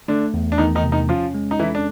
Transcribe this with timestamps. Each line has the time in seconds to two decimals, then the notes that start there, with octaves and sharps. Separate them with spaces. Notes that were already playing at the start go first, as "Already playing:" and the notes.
0.08 D3 A3 D4
0.34 E2
0.52 D4
0.58 E2 D#3 D#4
0.75 D#3 D#4
0.84 C3
0.92 D#3 D#4
1.09 F3 C#4 F4
1.34 G#3
1.51 D#4
1.59 E3 E4 A4
1.75 D4